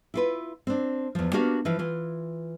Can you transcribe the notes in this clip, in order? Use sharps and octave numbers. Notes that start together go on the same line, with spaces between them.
E4 F4 B4
C4 D4
E2 F3
A#3 B3 D4 F#4 G4 F5
E3 F3 E4 F5
E3 F4